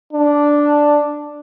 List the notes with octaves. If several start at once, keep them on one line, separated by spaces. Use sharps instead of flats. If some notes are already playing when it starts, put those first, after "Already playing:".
D4